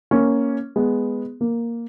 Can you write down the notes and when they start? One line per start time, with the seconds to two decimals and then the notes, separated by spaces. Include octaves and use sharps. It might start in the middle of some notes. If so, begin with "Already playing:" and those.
0.11 A#3 C#4
0.76 G#3 B3
1.41 A#3